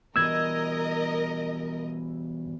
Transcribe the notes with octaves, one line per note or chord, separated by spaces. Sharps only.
B2 E3 G3 A#4 D#5 E6 G#6